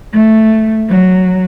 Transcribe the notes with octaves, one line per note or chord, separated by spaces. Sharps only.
A3
F#3